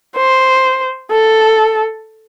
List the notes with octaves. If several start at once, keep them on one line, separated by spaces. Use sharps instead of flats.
C5
A4